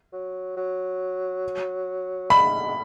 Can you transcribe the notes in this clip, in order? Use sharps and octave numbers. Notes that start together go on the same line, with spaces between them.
F#3
F#3
G#3 B5
G#3